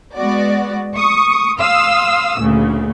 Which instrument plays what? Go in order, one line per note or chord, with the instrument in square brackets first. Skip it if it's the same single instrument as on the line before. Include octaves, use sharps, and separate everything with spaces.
[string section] G#3 B3 F#4 D5
C#6 D#6
F5 C6 D#6 E6
D2 A#2 C#3